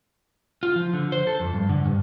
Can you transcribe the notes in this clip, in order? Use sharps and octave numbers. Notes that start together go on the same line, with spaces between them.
F4
F3
D3
C5
A4
F2
G2
D3
G2